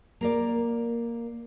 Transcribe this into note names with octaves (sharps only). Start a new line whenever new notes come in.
A#3 A#4 D5